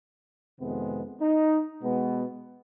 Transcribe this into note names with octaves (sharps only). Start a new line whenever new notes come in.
F2 C3 D#3 G#3 B3
D#4
B2 G#3 B3